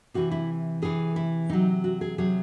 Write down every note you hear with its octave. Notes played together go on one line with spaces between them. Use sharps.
C3 E3 F#4
E4
C3 E3 G#4
E4
C3 F#3 D#4
F#4
G#4
C3 F#3 G#4